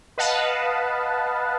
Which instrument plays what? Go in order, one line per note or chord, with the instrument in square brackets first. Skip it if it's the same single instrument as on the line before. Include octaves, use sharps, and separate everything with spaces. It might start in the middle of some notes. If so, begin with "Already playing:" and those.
[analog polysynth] B4 D#5 F5 F#5 A5